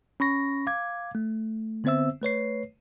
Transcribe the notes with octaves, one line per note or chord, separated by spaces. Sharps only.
C#4 B5 C#6 A#6
F5 D6 G#6
A3
D3 B3 C4 C5 E5 E6
A3 B4 C#5 C7